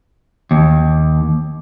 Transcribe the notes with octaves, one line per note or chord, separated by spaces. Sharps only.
D#2